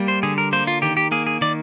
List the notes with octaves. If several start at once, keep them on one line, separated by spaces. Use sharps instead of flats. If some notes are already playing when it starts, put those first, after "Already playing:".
Already playing: G3 A#3
C5
D3 G#4
A#4
A#3 C5
F4
D#3 G4
G4
A#3 G#4
G#4
D#3 D5